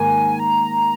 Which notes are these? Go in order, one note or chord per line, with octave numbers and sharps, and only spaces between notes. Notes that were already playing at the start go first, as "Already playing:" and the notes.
Already playing: G#2 D#3 A#3 G#5
A#5